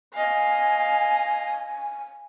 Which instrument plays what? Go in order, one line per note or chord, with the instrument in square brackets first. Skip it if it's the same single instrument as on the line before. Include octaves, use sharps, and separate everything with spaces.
[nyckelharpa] D#5 F5 [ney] G#5